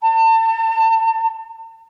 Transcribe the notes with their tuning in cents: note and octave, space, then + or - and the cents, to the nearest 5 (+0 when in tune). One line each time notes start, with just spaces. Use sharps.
A5 +35